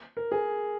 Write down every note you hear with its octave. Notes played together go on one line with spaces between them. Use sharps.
A#4
G#4